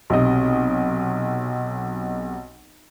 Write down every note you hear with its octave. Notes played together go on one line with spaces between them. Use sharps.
B1 C3 D#5